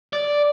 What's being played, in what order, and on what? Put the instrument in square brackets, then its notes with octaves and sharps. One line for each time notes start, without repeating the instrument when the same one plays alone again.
[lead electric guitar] D5